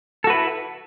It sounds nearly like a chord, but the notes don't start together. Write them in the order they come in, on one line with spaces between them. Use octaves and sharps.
A4 F#4 B4 E4